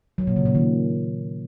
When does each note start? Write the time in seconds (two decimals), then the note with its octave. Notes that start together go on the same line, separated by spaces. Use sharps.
0.18 F#3
0.27 A#2
0.36 C#3
0.46 A#2
0.55 D#3